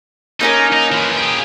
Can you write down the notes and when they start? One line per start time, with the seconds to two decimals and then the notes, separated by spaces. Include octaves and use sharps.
0.41 A#3 C#4 D#4 A#4
0.73 D#4
0.92 E3 F3
1.17 G4 G#4